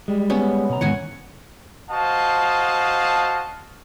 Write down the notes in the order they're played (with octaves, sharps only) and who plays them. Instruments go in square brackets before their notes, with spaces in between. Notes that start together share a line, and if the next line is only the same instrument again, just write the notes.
[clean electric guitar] G3 G#3
[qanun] B3 C#4
[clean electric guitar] B2 A#5
[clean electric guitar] E2 G#2 D#3 [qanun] C#5 F#5 G#5
[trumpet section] F#4 C5 D#5 F5 A5